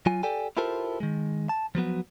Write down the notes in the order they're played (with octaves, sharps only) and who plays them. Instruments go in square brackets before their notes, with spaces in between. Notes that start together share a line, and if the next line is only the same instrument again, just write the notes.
[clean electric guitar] F#3 F4 G#5
G4 A4 D5 G5 G#5
E4 F4 G4 A4 A#4 C5
D#3 G#3
A5
F3 F#3 B3 F#4